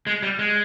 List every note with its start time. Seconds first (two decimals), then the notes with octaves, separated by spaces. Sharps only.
0.07 G#3
0.22 G3
0.39 G#3